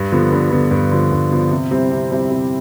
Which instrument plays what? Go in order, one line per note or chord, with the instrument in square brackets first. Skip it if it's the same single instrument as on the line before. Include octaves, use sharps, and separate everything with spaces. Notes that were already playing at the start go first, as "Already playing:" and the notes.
Already playing: [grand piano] G2
D3 F3 B3
G2
D3 F3 B3
G2
D3 F3 B3
G2
D3 F3 B3
C3
G3 C4 E4
C3
G3 C4 E4
C3